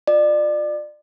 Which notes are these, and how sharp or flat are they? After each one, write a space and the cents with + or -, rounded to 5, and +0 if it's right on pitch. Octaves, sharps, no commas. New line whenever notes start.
F4 +20 D5 +30